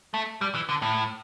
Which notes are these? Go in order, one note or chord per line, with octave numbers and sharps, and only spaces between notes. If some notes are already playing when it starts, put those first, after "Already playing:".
A3
G3
E3
D3
A2